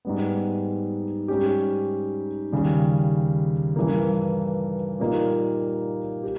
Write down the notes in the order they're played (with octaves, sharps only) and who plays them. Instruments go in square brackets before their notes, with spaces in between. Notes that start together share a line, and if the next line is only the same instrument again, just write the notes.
[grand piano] G#2 G3 B3
G#2 G3 C#4 G4
D#2 C#3 G3
G2 E3 A#3
A#2 G3 A#3 D#4
G4